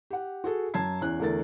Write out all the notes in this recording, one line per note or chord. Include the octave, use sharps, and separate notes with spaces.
G4 F#5
F#4 G#4 A4
F#2 A5 G#6 C7
E2 C#4 F#6
E2 D3 A3 A#4 A6